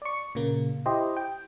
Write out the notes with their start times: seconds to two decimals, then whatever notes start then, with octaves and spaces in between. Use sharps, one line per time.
0.02 D5 C#6
0.35 A#2 C#3 A#3
0.86 E4 G4 C5 D#5
1.17 G5